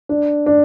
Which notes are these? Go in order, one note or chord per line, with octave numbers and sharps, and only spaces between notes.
D4
D4